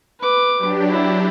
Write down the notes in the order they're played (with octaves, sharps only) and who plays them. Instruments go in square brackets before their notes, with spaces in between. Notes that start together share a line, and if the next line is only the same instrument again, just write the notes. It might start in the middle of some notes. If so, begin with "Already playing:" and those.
[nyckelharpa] B4 D6
[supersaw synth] F#3 D4 G4
[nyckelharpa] E4